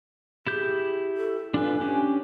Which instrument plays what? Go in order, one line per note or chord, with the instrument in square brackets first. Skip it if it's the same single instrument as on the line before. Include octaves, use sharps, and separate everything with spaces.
[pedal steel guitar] E4 G4 G6 [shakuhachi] G#4
[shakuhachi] A4
[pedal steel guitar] D4 F4 B4 [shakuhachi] G#5
[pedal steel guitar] C#4 D4 G4